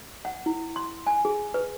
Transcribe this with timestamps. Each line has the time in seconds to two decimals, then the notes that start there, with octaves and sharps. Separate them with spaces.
0.25 F#5
0.46 E4
0.76 C6
1.07 G#5
1.25 G#4
1.54 B4